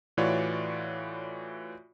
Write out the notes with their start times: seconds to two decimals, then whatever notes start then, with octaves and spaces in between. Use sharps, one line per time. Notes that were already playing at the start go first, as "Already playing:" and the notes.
0.17 A2 E3 F4 F#4 C#5 D5